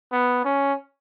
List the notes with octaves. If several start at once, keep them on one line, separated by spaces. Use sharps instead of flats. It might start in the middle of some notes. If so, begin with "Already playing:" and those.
B3
C#4